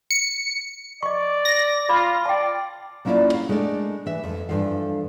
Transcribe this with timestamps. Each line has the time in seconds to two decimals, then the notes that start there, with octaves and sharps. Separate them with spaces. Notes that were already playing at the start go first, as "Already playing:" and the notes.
0.11 C#7
1.03 D5 D#5 C#6
1.45 A#6
1.89 F4 D5 B5 D6
2.25 D5 G5 A5
3.05 F#3 A#3 C#4 E4 F4 D5
3.30 A#4 F5
3.49 G#3 A3 D4 A#4 D5
4.06 E3 E5
4.24 F2
4.49 G2 E3 F3 A4 F5